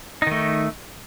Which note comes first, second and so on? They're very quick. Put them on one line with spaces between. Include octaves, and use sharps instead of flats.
D#4 D#3 A3